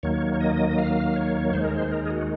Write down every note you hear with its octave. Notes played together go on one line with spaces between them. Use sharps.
D#2 D#3 F#3 A#3 C#5
C#5
D#5
F5
C#5
D#2 D#3 G#3 C5
A#4
C5
A#4
G#4
F#4